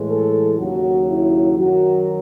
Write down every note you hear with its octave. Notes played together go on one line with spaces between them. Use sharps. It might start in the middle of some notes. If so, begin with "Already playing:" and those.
Already playing: A2 E3 G#3
A4
D#2 C#3 F#3 F#4
E4
F#2 D#3 F#3 F#4